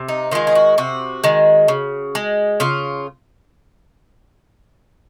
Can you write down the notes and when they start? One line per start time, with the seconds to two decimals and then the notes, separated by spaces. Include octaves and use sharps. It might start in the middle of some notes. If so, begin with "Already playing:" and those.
Already playing: C3
0.08 D#4
0.31 D#3 G#3 F4
0.47 G#4
0.55 F#4
0.78 C3 F#4
1.24 D#3 G#3
1.68 C#3
2.15 G#3
2.60 C#3 F4